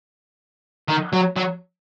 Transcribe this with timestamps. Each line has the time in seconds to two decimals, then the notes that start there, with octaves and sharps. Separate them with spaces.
0.88 D#3
1.13 F#3
1.36 F#3